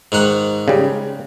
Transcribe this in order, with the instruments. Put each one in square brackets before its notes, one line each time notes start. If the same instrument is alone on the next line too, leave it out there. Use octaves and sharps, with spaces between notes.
[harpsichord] G#2 D#3 F#5
[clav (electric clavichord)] C#3 G3